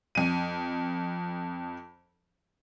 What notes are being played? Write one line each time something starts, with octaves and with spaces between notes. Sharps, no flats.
F2 D#7